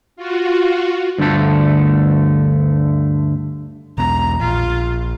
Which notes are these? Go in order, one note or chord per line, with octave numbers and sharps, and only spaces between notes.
F4 F#4
D2 G2 D3 A3 A4
B1 E2 B2 A#5
A#1 F4